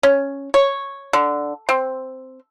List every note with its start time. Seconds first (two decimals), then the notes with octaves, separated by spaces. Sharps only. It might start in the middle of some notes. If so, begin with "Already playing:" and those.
0.03 C#4
0.54 C#5
1.13 D3
1.69 C4